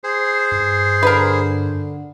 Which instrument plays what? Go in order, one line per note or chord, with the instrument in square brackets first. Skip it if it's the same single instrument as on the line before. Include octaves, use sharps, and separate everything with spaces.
[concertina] G#4 C5
[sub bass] G2
[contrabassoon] D3 [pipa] A#4 B4